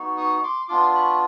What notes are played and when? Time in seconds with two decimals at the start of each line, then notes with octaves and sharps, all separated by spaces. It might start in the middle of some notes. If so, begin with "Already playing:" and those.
Already playing: B3 D#4 F#4
0.17 C#6 D#6
0.43 C6 D6
0.68 B3 D4 F4 C6 D6
0.95 B5 C#6